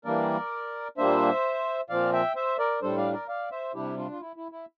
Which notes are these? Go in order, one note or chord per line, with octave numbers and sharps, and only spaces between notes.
E3 G3 A#3 D4 A#4 D5
A#2 G3 A#3 D4 C5 E5
A#2 F3 C4 D5 F5
E5 G5
C5 E5
A#4 D5
A2 G3 D4 A4 C5
D5 F5
A#4 D5
D5 F5
C5 E5
C3 G3 D4 E4 G4
D4 F4
F4
E4
E4
E4